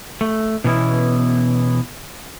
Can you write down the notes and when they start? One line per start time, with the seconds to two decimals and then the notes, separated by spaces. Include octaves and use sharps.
0.21 A3
0.64 B2 E3 B3 C#4 E4